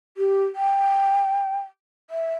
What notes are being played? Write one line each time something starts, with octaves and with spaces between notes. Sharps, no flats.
G4
G5
E5